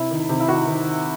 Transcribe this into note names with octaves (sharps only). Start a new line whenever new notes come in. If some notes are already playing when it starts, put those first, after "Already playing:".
Already playing: C3 E4
D#3
C3
E4
D#3 F#4
D#3